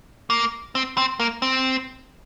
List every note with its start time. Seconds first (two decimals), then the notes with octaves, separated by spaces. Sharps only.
0.30 A#3
0.75 C4
0.97 C4
1.20 A#3
1.42 C4